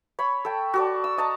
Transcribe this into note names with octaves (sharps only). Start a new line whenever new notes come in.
C#5 B5
A4 G5
F#4 A4 D5
E6
D#5 A5 A#5